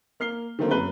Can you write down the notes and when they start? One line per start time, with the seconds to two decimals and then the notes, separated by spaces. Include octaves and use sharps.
0.20 A#3 F6 C7 G7
0.59 D3 D#3 F#3 A3 A#3 C4
0.71 F#2 B4 G7